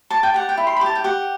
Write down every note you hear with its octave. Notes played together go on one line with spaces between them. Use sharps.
D5 A5
G5
G4 F#5
G5
E4
C6
B5
G4 A5
G5
G4 F#5